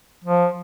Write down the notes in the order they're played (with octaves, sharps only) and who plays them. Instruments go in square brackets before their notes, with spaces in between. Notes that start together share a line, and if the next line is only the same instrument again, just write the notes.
[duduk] F3